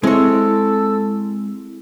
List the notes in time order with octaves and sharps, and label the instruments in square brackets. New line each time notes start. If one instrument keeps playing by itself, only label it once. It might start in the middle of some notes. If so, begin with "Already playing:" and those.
[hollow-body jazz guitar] G#3 C#5 [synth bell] C4 E4 [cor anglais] A4